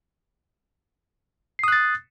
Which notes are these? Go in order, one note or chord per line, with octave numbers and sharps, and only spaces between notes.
D#6 F#6 A6 C7